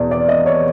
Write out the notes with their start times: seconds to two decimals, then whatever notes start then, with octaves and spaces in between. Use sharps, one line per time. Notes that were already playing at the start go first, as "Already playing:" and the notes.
Already playing: E2 B2 D5
0.11 D5
0.29 D#5
0.46 C#5